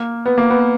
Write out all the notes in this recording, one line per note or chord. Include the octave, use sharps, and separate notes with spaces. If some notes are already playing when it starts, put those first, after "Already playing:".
Already playing: A#3
B3
A#3
B3